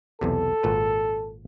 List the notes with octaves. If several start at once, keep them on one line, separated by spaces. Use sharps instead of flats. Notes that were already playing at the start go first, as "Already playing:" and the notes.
B1 E2 C3 A4
G#1 A#2 B4